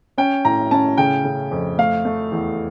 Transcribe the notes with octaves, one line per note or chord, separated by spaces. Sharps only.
C#4 G5
A2 A#5
C#4 A5
C#3 G5
C#3
F2
A3 F5
A3
E2